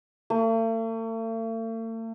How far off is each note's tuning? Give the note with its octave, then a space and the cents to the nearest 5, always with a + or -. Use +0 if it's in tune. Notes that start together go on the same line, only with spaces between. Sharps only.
A3 +45